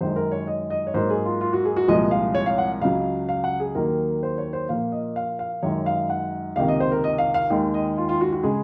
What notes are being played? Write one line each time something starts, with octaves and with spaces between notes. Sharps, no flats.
F#2 D#3 G#3 C5
A#4
C#5
D#5
D#5
C#5
G#2 F#3 A#3 C5
G#4
F4
F4
F#4
G#4
F#4
C2 A#2 F3 G#3 D#5
F5
C#5
F5
F#5
C#2 C#3 F#3 F5
F5
F#5
G#4
D#2 D#3 F#3 A#3 A#4
C5
C#5
C5
A#2 F3 A#3 F5
D#5
F5
F5
F#2 D#3 G#3 C#5
F5
F#5
C#2 C3 D#3 A#3 F5
D#5
C5
A#4
D#5
F5
F5
D#2 D#3 G#3
D#5
F4
F4
F#4
F#4
C#3 G#3 G#4